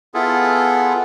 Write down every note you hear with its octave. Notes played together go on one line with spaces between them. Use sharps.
B3 E4 F4 G#4 A4